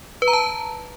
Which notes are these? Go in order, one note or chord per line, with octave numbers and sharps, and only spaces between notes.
B4
A#5
A5